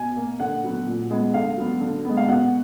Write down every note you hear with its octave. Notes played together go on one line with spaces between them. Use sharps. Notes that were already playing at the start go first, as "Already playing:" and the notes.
Already playing: B2 G#5
A#3
D3 F#5
F#3 B3
A#2
G#3 B3
D3 F5
F#3 B3
D3
G#3 B3
F5
B2 F#5